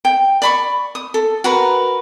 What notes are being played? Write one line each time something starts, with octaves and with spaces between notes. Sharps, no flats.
G5
D5 B5 C#6
D#6
A4
F#4 A#4 B4 A#5